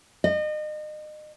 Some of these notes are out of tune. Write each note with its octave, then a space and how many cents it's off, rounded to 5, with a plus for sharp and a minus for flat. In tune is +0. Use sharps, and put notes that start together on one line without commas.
D#5 -35